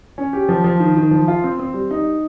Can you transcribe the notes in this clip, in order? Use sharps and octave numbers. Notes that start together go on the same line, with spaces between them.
C#4
G4
F3
F3
D#3
D#3
F3
F4
C4
C4
G3
D#4